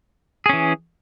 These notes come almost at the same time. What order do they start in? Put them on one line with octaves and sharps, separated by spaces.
G#4 C#4 E3